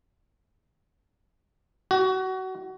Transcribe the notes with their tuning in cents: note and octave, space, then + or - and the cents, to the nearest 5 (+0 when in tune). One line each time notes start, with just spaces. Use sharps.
F#4 +25